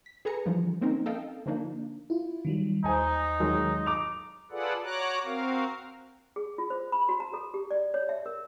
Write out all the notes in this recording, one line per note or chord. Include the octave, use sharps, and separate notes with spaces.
B6
G#4 A4 B4 G#5 A#5 C#7
D3 E3 F3 G3
A#3 C4 C#4 D#4 A#4
A4 A#4 D#5 F5 G5
D3 F3 A#3 D4 D#4
E4 F4
D#3 F#3 G3
D#2 D#4 C5 G#5 A#5
D#3 F#3 G#3
D6 F7
F4 G#4 A4 B4 D5 F#5
F#4 C#5 A#5 D6 F#6
C4 F#4 A#4 F5
G#4
F4
C5
B5
F#4
A#5
A4
G4
D5
C#5
E5
A#4